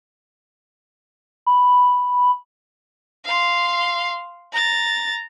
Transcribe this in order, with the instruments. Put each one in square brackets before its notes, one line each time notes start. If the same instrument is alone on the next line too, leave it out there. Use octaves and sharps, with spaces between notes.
[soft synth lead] B5
[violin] F5 C6
A#5 A6